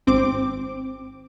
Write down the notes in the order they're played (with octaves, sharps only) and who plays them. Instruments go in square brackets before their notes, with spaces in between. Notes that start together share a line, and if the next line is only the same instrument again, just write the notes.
[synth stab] G#1 C4 D6